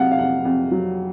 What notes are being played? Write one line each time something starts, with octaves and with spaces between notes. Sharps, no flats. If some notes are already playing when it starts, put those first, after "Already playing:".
Already playing: C3 F#3 F5 F#5
F5
F2 F#5
F2
F#3